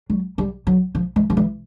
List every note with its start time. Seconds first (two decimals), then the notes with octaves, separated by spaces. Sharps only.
0.10 F#3
0.38 G3
0.67 F#3
0.95 F3
1.16 E3
1.30 F3
1.37 E3